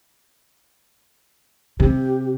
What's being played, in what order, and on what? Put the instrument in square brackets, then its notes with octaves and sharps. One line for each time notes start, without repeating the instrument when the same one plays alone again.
[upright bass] C3 [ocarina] G4